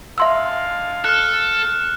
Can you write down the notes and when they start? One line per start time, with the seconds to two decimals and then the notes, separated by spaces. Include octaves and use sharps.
0.18 G#3 D4 E5 F5 C6 E6
1.04 A4 F6 F#6